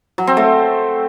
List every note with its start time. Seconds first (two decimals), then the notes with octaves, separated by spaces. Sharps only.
0.18 F#3
0.27 C4
0.37 A3